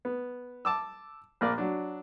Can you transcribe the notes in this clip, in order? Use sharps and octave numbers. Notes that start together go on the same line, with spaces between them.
B3
A5 D6 E6
A#1 A#3 D5
F#3 D4